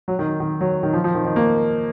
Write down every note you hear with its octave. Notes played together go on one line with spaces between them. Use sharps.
F#3
D#3
D#3
F#3
D#3
F3
F3
D#3
D#3
A#3